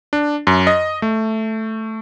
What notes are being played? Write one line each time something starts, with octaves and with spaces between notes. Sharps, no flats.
D4
F#2
D#5
A3